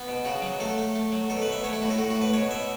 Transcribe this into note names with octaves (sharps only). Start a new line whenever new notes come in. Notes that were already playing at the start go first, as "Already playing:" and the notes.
Already playing: B3
B2
C#3 F#4
F#3
A3 A4
A3
A3
F#3
B2 A4
B4
B2
E5
A3 C#5
E4
A2 F#4
A4
A2 F#4
F#4
A2
B4
B2 C#5
B2 E5